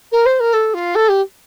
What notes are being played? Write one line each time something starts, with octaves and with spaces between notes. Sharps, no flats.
A#4
C5
A#4
A4
F4
A4
G4